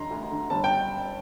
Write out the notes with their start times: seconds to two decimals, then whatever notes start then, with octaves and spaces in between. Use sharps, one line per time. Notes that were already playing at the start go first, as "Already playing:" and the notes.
Already playing: D3 A#5 C6
0.10 D2
0.31 D3
0.50 G1 A5
0.64 G5